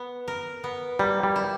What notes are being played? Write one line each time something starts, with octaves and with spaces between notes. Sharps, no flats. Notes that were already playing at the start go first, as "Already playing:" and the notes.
Already playing: B3
A#4
B3
G3 A#3
G3
E4